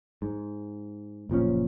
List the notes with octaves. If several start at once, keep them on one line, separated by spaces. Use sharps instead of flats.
G#2
F#1 A#2 F3 C#4